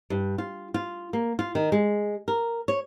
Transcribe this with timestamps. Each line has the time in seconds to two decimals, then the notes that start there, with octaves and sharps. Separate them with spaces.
0.10 G2
0.38 F4
0.74 F4
1.13 A#3
1.39 F4
1.55 D#3
1.72 G#3
2.28 A#4
2.68 C#5